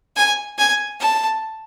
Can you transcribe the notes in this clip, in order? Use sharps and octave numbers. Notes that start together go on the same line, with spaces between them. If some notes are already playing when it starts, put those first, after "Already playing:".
G#5
G#5
A5